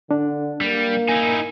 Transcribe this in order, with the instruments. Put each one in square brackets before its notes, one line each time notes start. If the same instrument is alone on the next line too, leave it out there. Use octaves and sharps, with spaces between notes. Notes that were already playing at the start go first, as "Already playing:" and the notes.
[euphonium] D3 [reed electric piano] D4
[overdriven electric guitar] G3 [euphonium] A#3
[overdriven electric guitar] D#4 E4 [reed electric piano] G#5